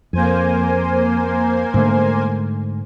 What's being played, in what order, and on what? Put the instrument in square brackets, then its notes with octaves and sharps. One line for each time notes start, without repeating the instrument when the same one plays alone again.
[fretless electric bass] F2 [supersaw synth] A#3 C5 G#5
[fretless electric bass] G#2 D3 A3